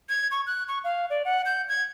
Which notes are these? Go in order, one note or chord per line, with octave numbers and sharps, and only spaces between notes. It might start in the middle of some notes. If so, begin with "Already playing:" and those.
G#6
C#6
F#6
C#6
F5
D5
F#5
G6
G#6